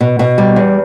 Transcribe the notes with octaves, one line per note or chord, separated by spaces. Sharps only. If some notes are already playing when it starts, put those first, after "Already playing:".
B2
B2
G3
E2